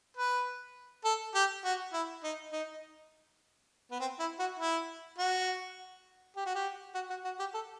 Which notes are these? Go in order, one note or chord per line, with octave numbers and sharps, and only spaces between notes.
B4
A4
G4
F#4
E4
D#4
D#4
B3
C4
E4
F#4
E4
F#4
G4
F#4
G4
F#4
F#4
F#4
G4
A4